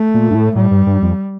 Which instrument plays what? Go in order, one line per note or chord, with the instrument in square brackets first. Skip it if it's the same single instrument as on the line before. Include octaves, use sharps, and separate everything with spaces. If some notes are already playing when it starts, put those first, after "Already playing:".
Already playing: [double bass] A3
[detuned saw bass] A#2
G2
A2
[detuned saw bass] A2 [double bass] G3
[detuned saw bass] G2
G2
F2